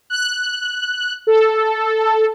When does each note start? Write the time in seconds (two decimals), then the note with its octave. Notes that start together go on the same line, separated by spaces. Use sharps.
0.10 F#6
1.27 A4